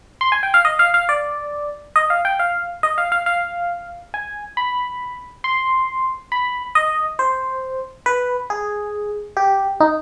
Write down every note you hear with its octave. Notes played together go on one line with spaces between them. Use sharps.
C6
G#5
G5
F5
D#5
F5
F5
D5
D#5
F5
G5
F5
D#5
F5
F5
F5
G#5
B5
C6
B5
D#5
C5
B4
G#4
G4
D#4